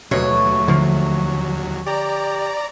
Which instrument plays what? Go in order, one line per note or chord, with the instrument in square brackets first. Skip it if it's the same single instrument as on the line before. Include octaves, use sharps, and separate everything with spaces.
[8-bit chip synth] D#2 F#3 [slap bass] B2 [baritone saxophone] A3 [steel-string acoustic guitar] C#5
[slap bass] D3 F3
[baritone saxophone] G4 [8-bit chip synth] D5 A#5